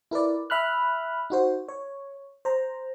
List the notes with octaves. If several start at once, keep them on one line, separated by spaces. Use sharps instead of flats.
E4 A#4 B4 D5
E5 B5 F6 F#6
D#4 F#4 C5
C#5
C5 A#5